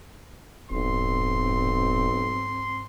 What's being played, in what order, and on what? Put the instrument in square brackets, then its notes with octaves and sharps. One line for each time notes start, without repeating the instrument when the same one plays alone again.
[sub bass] D#1 [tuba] B1 [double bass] G#2 C4 [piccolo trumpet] C6